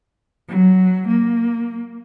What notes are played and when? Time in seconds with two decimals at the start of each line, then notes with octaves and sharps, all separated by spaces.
0.49 F#3
1.08 A#3